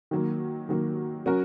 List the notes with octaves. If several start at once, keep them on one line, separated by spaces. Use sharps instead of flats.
D#3 F#3 A#3
D#3 F#3 A#3
F#3 C#4 F#4 A#4